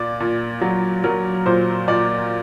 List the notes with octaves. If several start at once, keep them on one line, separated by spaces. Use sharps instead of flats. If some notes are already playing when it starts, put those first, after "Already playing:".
Already playing: A#2 D5
A#2
F#3
F#3 A#4
A#2 C5
A#2 D5